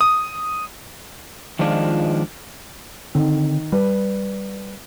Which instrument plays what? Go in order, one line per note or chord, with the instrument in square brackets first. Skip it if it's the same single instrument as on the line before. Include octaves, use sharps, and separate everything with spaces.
[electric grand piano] D#6
[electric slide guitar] D#3 F3 G#3 D4 F4
[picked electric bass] D3 C4 [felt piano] D#3
[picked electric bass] G3 [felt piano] B4